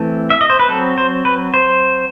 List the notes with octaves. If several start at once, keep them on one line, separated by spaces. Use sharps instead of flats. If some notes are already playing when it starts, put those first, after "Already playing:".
Already playing: E3 A3 C4
E5
D#5
C5
B4
F#3 C4 A4
C5
B4
C5